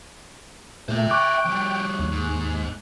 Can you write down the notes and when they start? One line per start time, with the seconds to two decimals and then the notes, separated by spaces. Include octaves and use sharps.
0.88 A#2 A3 C5 E5
1.10 G5 C#6 D6 F#6
1.45 F3 G3
1.99 D#2
2.12 G#2